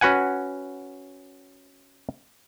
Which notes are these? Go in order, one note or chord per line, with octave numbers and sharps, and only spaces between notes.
C#4 F#4 B4 F#5 G#5